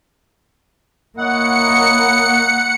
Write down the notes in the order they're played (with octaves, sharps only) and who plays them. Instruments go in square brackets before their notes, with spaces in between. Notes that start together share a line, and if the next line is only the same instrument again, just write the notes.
[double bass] A#3 [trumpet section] E4 C#5 D#5 [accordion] F#5 [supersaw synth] C#7